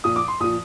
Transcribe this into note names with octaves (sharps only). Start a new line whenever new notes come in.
A#2 F3 D#6
D6
C6
A#2 F3 D#6